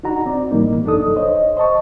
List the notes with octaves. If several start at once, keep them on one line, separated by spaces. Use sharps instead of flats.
D4 D#4 F#4 A#5
C4 D5
A2 E3 G3 A#3 D#4
C2 F#2 D4 D#4 A4 D#6
C5 C#5 D#5
C5 D#5 A5 C#6